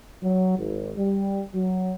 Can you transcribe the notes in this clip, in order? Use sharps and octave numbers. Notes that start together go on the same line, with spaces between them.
F#3
G#1
G3
F#3